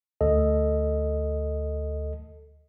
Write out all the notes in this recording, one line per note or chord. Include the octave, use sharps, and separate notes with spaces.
D2 A4 D#5